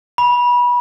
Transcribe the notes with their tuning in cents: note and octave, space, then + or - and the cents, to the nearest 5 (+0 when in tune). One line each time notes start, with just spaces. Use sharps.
B5 -25